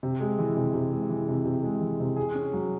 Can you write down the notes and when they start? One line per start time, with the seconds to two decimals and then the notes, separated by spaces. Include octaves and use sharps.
0.03 C3
0.20 G#3
0.39 E3
0.57 C3
0.74 C3
0.92 G#3
1.09 E3
1.28 C3
1.45 C3
1.63 G#3
1.81 E3
2.00 C3
2.16 G#4
2.35 C#4
2.53 F#3